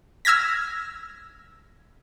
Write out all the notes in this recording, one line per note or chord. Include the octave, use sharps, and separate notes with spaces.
E6 F6 G#6 A#6 B6